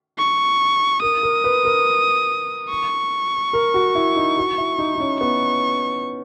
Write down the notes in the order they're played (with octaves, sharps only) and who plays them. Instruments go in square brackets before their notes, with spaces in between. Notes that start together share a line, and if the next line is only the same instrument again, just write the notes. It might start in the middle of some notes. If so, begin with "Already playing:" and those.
[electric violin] C#6
[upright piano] A#4 [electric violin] D#6
[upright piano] A#4
B4
A#4
[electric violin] C#6
[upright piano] A#4
F#4
E4
D#4
F#4
E4
D#4
D#4
C#4
[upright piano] B3 [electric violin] C#6